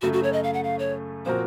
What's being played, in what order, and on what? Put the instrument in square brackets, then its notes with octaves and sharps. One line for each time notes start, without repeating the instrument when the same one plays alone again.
[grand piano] F#2 C#3 A3 [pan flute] F#4
[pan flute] F#4
C#5
D#5
F5
F#5
F5
C#5
[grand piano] A#2 F3 C4 F#4 A#4 [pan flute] C5